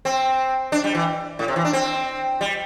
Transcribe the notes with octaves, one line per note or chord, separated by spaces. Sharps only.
C4
D4
G3
E3
A2
C3
E3
D4
C4
G3